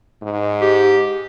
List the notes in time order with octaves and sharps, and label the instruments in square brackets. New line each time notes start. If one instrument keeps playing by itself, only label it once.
[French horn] G#2
[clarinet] G4